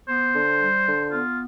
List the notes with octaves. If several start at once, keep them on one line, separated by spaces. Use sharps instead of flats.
B3 C5
D3
G3
D3
B3 F4